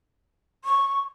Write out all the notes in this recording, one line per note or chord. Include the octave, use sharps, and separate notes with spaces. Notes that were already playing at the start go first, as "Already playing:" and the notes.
C#6